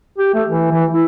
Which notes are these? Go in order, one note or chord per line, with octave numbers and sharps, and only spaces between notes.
G4
A3
E3
E3
E4